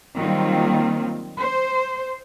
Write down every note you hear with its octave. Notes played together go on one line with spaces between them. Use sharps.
D#3 F#3 G3 A#3 C4 F4
C5